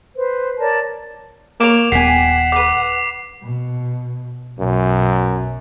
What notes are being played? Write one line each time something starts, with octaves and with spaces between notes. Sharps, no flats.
B4 C5
A#4 C#5 D5 A5
A#3 C#5 D6 E7 F7
D#1 B3 G4 F#5 G#5 B6 C7
B4 D6 F#6
B2
B1 F#2 B2